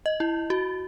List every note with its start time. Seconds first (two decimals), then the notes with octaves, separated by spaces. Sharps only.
0.06 D#5
0.20 E4
0.50 F#4